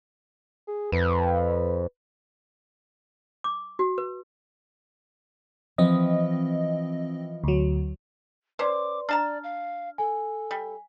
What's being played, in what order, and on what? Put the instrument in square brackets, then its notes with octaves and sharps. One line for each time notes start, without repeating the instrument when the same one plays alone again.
[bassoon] G#4
[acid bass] F2 [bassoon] B4
[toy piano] D6
F#4
B4
[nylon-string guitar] E3 F3 [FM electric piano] C4 D#5
[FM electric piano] D2 F#3
[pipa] C#4 C5 [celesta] B4 D5 C6 [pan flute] D6
[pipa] D4 A5 A#5 [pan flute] D5 [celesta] F6
[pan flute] F5
[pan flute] A4 [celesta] G#5
[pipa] G3